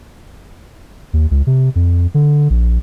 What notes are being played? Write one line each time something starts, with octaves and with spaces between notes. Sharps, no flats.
D#2
C#2
C3
F2
D3
A#1